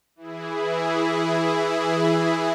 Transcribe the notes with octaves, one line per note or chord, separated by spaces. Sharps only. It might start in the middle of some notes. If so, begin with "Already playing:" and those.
E3 E4 G#4